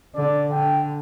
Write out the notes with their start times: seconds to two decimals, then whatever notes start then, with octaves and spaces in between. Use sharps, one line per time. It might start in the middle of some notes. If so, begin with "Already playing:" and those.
0.15 D3 D5
0.51 D3 G5